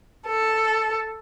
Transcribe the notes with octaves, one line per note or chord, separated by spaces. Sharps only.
A4